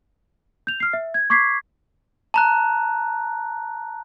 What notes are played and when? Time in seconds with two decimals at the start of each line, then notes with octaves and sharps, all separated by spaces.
0.67 G6 F7
0.80 F6 C7
0.93 E5
1.14 G#6
1.30 C#6 D6 G#6 B6 C7
2.34 A5 A#5 F#6